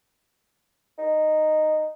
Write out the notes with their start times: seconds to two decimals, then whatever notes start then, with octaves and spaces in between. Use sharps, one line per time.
0.98 D#4